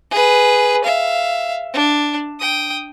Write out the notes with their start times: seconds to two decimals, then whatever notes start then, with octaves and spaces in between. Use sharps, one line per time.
0.11 G#4 B4
0.84 E5 F5
1.74 D4
2.40 G5 D#6